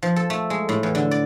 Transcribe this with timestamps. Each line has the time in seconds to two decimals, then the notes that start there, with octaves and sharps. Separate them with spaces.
0.03 F3
0.16 A4
0.30 A3
0.50 G#3
0.69 A2
0.83 E2
0.95 D3
1.11 D5